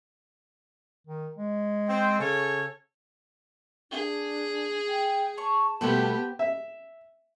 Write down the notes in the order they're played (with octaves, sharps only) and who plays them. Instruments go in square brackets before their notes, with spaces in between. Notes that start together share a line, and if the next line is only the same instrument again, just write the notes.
[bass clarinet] D#3
G#3
[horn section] C4
[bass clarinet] C#3 [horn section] C#4 A4 C#5
[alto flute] D4 [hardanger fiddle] G#4
[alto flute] G5
[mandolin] C#5 C#6 [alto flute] A5
[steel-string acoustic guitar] B2 G3 A3 [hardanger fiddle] B3 G4 [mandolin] B4 C5 G5
[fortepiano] E5